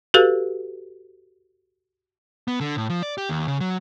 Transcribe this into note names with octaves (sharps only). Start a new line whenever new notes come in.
F#4 G4 A4 B4 F5
B3
D3
A2
F3
D5
G4
D#2
C#3
F#3